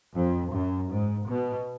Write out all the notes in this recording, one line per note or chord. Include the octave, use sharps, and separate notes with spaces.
F2
F#2
G#2
B2